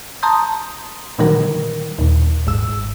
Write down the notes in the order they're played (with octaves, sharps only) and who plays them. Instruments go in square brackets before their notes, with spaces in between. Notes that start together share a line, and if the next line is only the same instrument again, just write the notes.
[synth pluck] A5 A#5 C6 D#6 G6
A#2 D3 D#3 F#3 G3 A#4
D#2 A#2
G1 G#2 E6